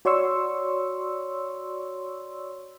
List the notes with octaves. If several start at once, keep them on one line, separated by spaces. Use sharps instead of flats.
F#4 C#5 D5 C6 C#6 E6